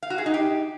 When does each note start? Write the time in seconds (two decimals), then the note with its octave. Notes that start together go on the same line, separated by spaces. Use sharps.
0.03 F5
0.10 F#4
0.18 G#4
0.26 D#4
0.34 G4